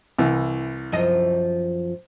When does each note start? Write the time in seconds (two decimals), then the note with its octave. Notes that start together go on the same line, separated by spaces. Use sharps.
0.18 C2 E3
0.92 F#2 F3 D#5